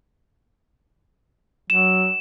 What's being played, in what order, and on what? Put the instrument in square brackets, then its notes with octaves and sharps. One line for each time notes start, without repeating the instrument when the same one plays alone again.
[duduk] F#3 [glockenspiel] E7